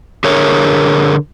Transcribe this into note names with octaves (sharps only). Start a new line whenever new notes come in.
D3 G#4 A#4 C#5